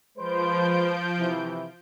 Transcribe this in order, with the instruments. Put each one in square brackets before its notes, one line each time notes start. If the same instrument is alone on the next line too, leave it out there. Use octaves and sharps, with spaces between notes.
[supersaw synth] F3 G6 D7 [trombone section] G#3 B4 C5
[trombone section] C3 E3 E4